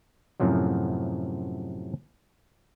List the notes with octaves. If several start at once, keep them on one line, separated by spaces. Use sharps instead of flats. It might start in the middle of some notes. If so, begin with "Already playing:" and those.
F#2 A2 C3 F3 F#3